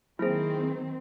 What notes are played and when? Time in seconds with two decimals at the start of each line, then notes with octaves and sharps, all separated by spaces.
0.19 D#3 F#3 A#3 C4 E4 G#4 C5